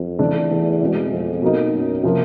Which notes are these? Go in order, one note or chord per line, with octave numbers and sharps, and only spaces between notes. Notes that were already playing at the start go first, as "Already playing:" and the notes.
Already playing: F2
E3 A3 D4
E2
B2 G#3 C4 E4
F2
B2 F#3 A#3 D#4
F#2
C3 F3 A#3